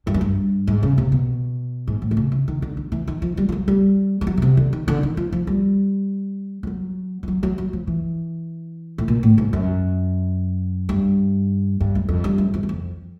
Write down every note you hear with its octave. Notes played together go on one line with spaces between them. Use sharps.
G2
F#2
G2
G#2
C#3
C3
B2
G#2
A2
D3
C#3
C#3
D#3
D3
D3
E3
D#3
F3
G3
F3
F#3
G3
G3
F#3
C#3
C3
D3
D#3
D3
D#3
F3
F3
G3
F3
F#3
F3
F#3
F#3
F#3
F3
E3
A2
A#2
A2
G#2
F#2
G2
G2
F#2
F2
G2
F#2
F2
E2
F2